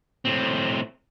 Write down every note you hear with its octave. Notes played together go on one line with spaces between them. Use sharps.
A2 C4